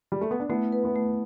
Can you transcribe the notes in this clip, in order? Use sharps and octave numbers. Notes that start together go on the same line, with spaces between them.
G3
A3
B3
D4
A3 B3 E4
B4
B3 E4
A3